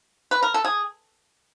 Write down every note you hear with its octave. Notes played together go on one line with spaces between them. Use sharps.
B4
A#4
A4
G#4